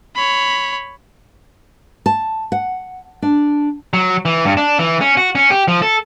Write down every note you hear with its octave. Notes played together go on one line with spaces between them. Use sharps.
C#5 B5
A5
F#5
D4
F#3
E3
G2
D4
E3
C#4
F#4
C#4
G4
F3
A4